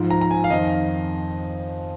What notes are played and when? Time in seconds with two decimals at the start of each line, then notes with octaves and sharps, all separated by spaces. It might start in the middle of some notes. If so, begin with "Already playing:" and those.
Already playing: G#2 F3
0.10 A#5
0.21 A#5
0.31 G#5
0.44 F5
0.50 F2 D#3 D#5